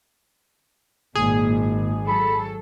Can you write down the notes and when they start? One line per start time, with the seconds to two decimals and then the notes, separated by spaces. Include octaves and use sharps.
1.16 G#1 A#2 G#4
2.08 F#3 A4 B5